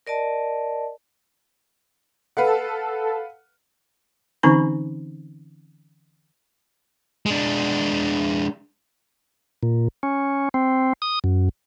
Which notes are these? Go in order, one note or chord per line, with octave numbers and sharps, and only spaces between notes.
A#4 D5 D#5 A5
A4 B4 F5 F#5
D3 E3 C4 C#4 D#4 B5
G#3 D4
A#2
C#4
C4
D#6
F#2